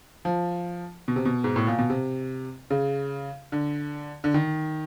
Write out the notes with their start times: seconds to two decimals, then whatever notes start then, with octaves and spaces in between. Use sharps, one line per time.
0.25 F3
1.08 B2
1.16 C3
1.25 B2
1.44 G#2
1.56 A2
1.67 A#2
1.78 B2
1.90 C3
2.70 C#3
3.52 D3
4.24 D3
4.34 D#3